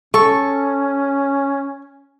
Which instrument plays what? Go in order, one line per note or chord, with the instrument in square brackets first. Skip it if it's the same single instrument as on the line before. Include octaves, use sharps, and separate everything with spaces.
[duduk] C#4 [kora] A4 [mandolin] C#6